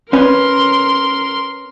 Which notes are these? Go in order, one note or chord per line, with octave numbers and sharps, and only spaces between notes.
C#4 A#4 B4 C6